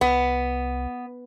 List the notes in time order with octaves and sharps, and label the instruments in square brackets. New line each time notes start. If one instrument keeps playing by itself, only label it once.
[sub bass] C2 [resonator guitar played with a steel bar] B3